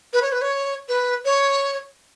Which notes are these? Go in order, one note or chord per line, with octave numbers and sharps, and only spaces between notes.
B4
C#5
B4
C#5
B4
C#5